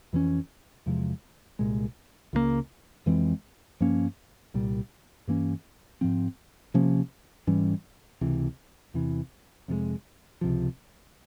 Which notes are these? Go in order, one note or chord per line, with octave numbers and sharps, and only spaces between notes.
F2 E3 A#3 C#4
E2 C3 F3 G#3
C2 A#2 G#3
C#2 C#3 E3 A#3
F2 E3 G#3 C4
G2 F3 A#3 C#4
C2 A#2 G3
G2 E3 A#3 C#4
G#2 F3 C4
C3 F3 A#3 C#4
G#2 E3 G3 C#4
C#2 C3 E3
E2 C3 E3
F2 C3 F3 G#3
C#2 C3 F3